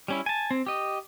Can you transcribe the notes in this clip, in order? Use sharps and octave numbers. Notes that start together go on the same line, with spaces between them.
G3 C#4 E4
G#5 A5
C4
G4 D#5